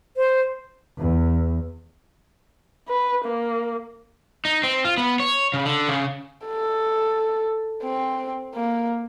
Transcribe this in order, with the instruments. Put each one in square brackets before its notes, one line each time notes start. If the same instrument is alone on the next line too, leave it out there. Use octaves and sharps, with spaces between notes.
[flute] C5
[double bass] E2
[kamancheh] B4
A#3
[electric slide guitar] D#4
C4
F4
B3
C#5
C#3
D3
C#3
[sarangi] A4
C4
A#3